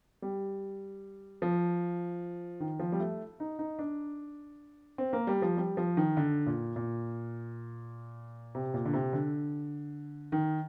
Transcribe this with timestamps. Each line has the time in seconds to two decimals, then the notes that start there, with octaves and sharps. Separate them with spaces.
0.22 G3
1.42 F3
2.60 D#3
2.80 F3
2.92 G3
3.00 A3
3.40 D#4
3.59 D#4
3.79 D4
4.98 C4
5.13 A#3
5.27 G3
5.42 F3
5.57 G3
5.77 F3
5.97 D#3
6.17 D3
6.46 A#2
6.76 A#2
8.55 C3
8.74 A#2
8.85 D3
8.93 C3
9.13 D3
10.32 D#3